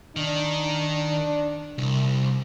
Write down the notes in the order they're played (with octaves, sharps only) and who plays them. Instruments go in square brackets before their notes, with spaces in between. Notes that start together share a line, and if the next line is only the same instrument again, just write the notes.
[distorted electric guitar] D#3 [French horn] D4
[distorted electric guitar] C2